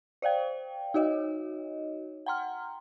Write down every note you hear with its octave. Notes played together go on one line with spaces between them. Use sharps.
C5 D5 F5 G5
D#4 F#4 C#5 D#5
F#5 G5 A#5 C6 F6